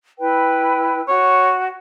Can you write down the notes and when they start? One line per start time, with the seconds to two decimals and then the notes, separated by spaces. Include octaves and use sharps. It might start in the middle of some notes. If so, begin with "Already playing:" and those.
0.19 E4 B4 G5
1.08 F#4 C#5